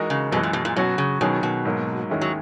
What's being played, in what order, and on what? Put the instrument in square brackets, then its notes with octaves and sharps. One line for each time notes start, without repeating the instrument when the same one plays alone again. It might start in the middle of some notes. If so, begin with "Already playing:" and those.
Already playing: [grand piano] E3 G#3 D#4 F#4 A#4
[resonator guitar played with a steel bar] C#3
[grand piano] F#2 E3 G#3 [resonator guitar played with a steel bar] B2
[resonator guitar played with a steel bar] A#2
B2
A#2
[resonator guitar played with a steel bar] B2 [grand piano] F#3 C#4 F#4
[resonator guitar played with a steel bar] C#3
[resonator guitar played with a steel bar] B2 [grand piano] D#3 F#3 C#4 G#4
[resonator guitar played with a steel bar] B2
[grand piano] G#2 F#3 A#3
D#2 D#3 G#3 C#4 E4
[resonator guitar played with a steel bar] F#3